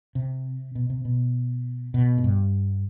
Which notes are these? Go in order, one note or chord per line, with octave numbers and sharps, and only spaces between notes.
C3
B2
C3
B2
B2
A2
G2